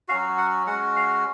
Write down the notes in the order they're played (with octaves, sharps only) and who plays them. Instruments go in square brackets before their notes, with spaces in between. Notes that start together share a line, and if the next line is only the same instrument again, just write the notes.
[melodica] F#3 C#4 F#4 F5
F#5
G#3 C#4 F#4 F#5
F5